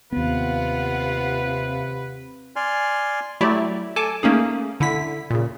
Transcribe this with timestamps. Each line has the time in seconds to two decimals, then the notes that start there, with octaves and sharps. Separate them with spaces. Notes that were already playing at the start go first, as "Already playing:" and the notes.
0.12 D#2 C3 B3 F4 B4 F5 F#5
2.56 D5 G#5 C6 F6
3.41 F#3 A3 E4 G4 D5 E5
3.96 A4 G#5 A5 D6
4.23 A3 A#3 C#4 D#4 G#4
4.80 D3 E4 B6
5.31 A#2 C#3